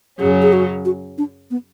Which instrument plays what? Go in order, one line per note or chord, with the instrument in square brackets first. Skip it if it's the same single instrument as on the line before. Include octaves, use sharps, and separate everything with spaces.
[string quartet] F#2 C#3 F#3 C#4 [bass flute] G#4
[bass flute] G#4
F#4
F#4
D4
B3